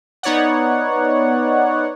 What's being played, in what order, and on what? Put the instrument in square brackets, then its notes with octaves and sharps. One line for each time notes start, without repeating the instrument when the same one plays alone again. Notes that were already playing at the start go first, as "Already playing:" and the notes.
[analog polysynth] B3 D#4 C#5 D5 F#5